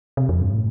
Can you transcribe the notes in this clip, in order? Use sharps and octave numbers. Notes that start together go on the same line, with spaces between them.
C3
F2
G2
A2